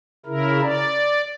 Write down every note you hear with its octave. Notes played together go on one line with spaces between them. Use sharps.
C#3 E4 A#4
D5